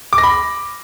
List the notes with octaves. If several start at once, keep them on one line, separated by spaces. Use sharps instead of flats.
D6
A#6
B5